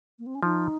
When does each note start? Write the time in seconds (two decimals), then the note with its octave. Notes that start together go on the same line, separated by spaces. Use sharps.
0.19 A#3
0.26 C4
0.35 C#4
0.43 F3 D#4